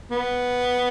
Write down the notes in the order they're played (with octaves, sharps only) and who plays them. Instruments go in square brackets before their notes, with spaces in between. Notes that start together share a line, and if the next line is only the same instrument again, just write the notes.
[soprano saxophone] B3